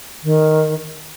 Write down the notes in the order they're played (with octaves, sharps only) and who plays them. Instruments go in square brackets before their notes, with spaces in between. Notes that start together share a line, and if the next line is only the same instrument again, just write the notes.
[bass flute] D#3